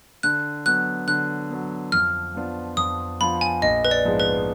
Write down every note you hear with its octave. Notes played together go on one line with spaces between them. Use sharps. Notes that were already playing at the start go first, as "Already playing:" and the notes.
D3 F#6
F#3 B3 F#6
D3 F#6
F#3 B3
F2 F6
F3 B3 D4 F4
F2 D#6
F3 B3 D4 F4 B5
G#5
A#1 D#5
B4
D5
G#2 F3 G#3 B3
B4